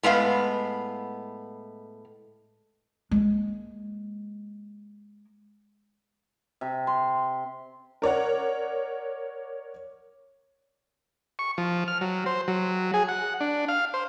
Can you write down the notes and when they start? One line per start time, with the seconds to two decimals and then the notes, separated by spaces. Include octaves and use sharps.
0.03 A2 G#3 B3 F5
3.11 G#3 A#3
6.61 C3
6.87 C6
8.02 A#4 C#5 D5 F#5
11.39 C#6
11.58 F3
11.88 F6
12.01 F#3
12.26 C5
12.48 F#3
12.94 G#4
13.08 F#5
13.41 D4
13.68 F5
13.94 C5